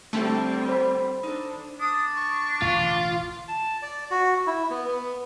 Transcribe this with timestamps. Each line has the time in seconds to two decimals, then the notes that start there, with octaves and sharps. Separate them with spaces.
0.13 D3 G3 A3 C4 G4 A4
0.69 C5 B5
1.23 D4 D#4 A4
1.80 D4 D#6
2.15 C#6
2.62 E1 A1 D3 F4
3.48 A5
3.82 D5
4.11 F#4
4.47 E4
4.70 B3
4.87 B3